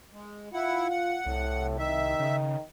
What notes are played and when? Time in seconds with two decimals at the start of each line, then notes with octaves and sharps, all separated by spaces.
0.13 G#3
0.53 E4 F4 F#5
0.90 F#5
1.26 C2 A2
1.79 D#3 E5
2.20 C#3